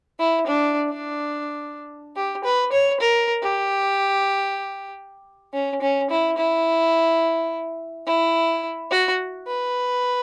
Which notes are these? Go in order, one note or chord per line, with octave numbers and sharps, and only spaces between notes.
E4
D4
D4
G4
B4
C#5
A#4
G4
C#4
C#4
E4
E4
E4
F#4
B4